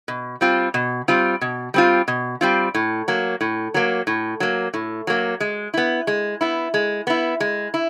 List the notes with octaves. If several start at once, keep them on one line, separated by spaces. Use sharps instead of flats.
B2
G3 C4 F4
B2
G3 C4 F4
B2
G3 C4 F4
B2
G3 C4 F4
A2
F#3 A#3
A2
F#3 A#3
A2
F#3 A#3
A2
F#3 A#3
G#3
B3 E4
G#3
B3 E4
G#3
B3 E4
G#3
E4